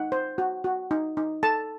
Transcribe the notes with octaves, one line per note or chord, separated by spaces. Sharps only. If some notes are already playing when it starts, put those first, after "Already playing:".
Already playing: D#4 F#5
C5
F#4
F#4
D#4
D#4
A4 A5